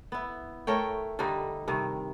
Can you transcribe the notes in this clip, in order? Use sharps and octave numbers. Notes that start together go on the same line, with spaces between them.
B3 E4
A3 A#4 C#5 G5
G2 D3 G3 D#4
G2 C3 D#3